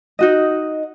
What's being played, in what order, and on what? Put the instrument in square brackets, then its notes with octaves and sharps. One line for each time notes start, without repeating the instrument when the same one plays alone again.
[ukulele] D#4 F#4 D#5